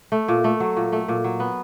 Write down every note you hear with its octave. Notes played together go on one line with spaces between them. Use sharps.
A3
A#2
A3
F#3
A#2
A3
A#2
F#3
B3